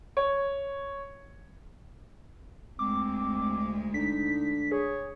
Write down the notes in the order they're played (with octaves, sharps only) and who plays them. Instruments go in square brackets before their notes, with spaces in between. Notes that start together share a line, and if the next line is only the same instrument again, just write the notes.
[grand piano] C#5
[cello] D2 G#3 [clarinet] C4 [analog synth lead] D6
[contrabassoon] D3 [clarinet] D#4 [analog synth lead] B6
[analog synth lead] G#4 [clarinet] C#5